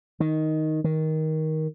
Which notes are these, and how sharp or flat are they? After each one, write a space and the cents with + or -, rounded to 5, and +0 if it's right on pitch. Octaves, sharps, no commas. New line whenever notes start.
D#3 +5
D#3 +15